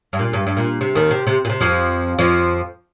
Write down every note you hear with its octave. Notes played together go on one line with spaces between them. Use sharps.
G2
A#2
G2
G2
A#2
C3
D#2 D#3
C3
C3
A#2
C3
F2 F3
F2 F3